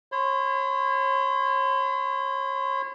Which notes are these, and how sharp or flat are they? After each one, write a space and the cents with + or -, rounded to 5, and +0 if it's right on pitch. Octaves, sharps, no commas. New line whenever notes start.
C#5 -35 C6 -45